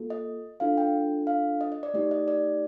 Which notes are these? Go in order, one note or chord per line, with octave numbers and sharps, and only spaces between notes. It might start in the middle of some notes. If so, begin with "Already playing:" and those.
Already playing: A#3 F4 A4
D#5
D4 F4 A4 F5
G5
F5
D#5
D#5
D5
A3 D#4 G4 D5
D#5
D5